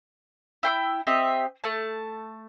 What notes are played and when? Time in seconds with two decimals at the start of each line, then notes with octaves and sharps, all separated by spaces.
0.63 E4 G5 C6 E6
1.07 C4 G4 D#5 E5
1.64 A3 A5